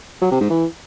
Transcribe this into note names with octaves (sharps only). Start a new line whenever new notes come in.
F#3
C3
G#2
E3